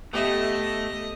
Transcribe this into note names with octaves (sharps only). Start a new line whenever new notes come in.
A3 B3 G4 D#5 E5 D#6